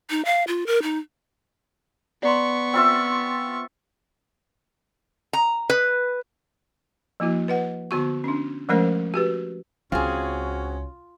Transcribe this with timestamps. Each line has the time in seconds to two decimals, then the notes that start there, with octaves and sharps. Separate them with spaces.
0.10 D#4
0.25 F5
0.47 F4
0.67 A#4
0.82 D#4
2.23 B3 D5 A#5 C6 C#6
2.74 C4 F4 E5
5.33 A#5
5.70 B4
7.20 F3 A#3 E4 F#4
7.48 B4 D#5 F#5
7.91 D3 B3 F#4 C#6
8.24 C#4 D4
8.69 F3 G#3 A3 C#4 A#4 C5
9.14 F#4 G4 B4
9.92 C#2 C4 C#4 F4 F#4 G#4